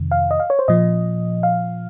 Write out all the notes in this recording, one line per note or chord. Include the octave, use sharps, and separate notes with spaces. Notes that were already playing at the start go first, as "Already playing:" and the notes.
Already playing: F2 C3 D#3
F5
D#5
F5
C#5
C5
A#2 F3 D#5
F5